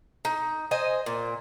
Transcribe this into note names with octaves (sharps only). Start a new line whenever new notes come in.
D#4
C5 D#5 G#5
A#2